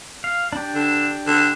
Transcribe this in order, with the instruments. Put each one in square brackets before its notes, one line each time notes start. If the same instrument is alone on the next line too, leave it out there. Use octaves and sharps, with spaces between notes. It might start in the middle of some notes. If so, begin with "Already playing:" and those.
[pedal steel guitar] F5
D4 G4
[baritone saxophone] D3
D3